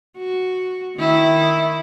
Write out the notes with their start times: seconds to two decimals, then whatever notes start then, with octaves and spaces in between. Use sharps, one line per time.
0.18 F#4
0.96 D#3 E4